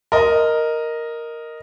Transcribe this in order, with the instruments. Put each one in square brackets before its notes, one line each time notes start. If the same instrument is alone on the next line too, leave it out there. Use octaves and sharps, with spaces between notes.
[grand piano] A#4 D#5